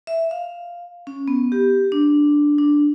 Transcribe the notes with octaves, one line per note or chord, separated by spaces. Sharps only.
E5
F5
C#4
B3
G4
D4
D4